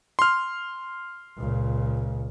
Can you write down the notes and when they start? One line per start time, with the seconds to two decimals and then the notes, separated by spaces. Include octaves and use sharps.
0.19 C6 F6
1.38 C#2 A#2